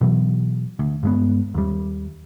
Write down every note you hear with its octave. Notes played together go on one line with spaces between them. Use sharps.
B2 E3 F#3
D2
G2 G#3 B3
D#2 G3